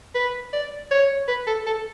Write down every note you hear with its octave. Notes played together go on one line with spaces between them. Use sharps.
B4
D5
C#5
B4
A4
A4